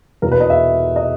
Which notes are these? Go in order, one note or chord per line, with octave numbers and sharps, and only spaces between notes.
E2 B2 A#4
B4
D#5
E5
D#5